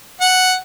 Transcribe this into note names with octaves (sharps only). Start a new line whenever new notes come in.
F#5